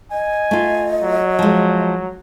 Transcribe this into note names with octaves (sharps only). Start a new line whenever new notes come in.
D#5 G#5
A3 F4
F#3
F3 G#3